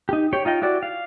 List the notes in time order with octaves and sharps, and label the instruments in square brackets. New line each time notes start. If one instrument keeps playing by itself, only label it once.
[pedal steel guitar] D#4 G4
G4 C#5 G5
D#4 F4 D#5 G5
E4 F#4 G4 D5
F5